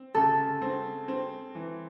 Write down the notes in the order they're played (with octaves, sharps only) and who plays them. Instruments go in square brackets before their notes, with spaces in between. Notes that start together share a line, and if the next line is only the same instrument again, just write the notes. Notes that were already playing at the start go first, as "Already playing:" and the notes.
Already playing: [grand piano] C4
[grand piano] C#3 [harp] A4
[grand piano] C4
C4
E3